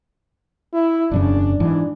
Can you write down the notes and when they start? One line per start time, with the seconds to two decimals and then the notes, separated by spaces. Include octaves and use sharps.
0.73 E4
1.11 E1 F#2 C#3 D4
1.60 G#2 E3 D4